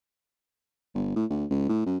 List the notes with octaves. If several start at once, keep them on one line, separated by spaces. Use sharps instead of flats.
G1
A2
D2
C#2
A2
F#2